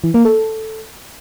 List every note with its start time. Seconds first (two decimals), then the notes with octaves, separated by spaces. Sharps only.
0.04 E3
0.14 A#3
0.25 A4